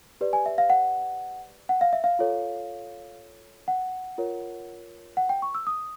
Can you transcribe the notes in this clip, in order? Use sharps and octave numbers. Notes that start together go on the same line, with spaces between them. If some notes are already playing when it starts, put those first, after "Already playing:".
G4 B4 D5
G#5
E5
F5
F#5
F#5
F5
E5
F5
F4 A4 C#5
F#5
F4 A#4 C#5
F#5
G5
C#6
E6
D#6